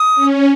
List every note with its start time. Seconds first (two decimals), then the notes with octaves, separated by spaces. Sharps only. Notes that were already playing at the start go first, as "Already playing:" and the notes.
Already playing: D#6
0.15 C#4